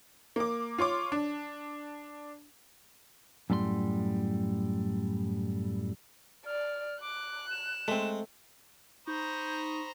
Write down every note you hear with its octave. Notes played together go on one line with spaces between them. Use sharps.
A#3 D6
F4 C#5 C6 D6
D4
F#2 A2 G3 A4 C6
D5 F6
D6 F#6
E7
G#3 A3 C4
D#4 C5 A#5 B5 C#6 D#6 G6